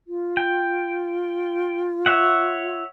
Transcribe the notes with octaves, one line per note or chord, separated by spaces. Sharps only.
F4
G5
C#5 E5 F#5